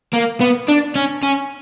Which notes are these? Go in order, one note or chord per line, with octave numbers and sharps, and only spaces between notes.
A#3
B3
D4
C#4
C#4